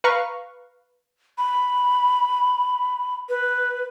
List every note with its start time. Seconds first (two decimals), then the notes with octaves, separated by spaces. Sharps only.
0.04 B4 F5 A#5 C#6
1.38 B5
3.29 B4